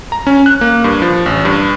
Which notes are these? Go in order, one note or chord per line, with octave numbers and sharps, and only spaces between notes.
A#5
C#4
F#6
A#3
G2
F3
A1
G2